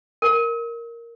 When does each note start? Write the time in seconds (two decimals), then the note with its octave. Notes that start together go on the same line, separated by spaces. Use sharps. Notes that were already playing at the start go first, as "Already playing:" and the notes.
0.22 A#4